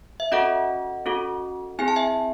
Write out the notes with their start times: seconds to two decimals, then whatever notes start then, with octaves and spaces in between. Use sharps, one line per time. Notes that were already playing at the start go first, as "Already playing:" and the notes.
0.20 E5
0.32 C#4 F#4 A4 D#5 F#5
1.06 C#4 F#4 A4
1.79 C4 E4 G#4 G#5
1.88 A5
1.96 E5 G#5